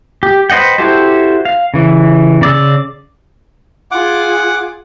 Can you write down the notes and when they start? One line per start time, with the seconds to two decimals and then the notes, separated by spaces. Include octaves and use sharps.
0.23 G4
0.50 B4 C5 D#5 F#5 G5
0.78 E4 F#4 G4 A4 C5
1.45 F5
1.74 C#3 E3
2.41 C#3 D5 E6
3.91 F4 G#4 F#5 D6